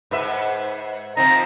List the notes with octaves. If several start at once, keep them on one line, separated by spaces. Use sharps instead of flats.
G#2 B4 E5
F3 C4 D#4 A#5